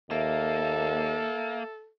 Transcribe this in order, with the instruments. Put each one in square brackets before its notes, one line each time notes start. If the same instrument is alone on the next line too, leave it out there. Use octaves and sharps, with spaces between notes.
[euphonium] D#2 [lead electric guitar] A#3 [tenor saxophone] A4 [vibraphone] E5